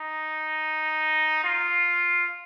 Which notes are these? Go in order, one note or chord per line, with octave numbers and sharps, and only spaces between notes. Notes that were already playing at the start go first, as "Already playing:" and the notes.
Already playing: D#4
F4